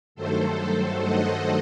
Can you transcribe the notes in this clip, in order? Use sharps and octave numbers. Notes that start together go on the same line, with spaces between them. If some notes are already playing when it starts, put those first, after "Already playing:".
G2 D#3 F#3 A3 A4 C5
D#5 F#5